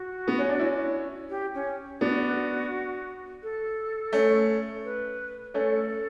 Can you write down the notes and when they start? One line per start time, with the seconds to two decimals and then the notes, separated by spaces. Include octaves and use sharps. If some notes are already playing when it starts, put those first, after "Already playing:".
Already playing: F#4
0.27 B3
0.39 C#4
0.49 D4
0.59 C#4 E4
1.30 G4
1.54 C#4
2.00 B3 D4 F#4
3.43 A4
4.13 A3 C#4
4.84 B4
5.54 A3 C#4 A4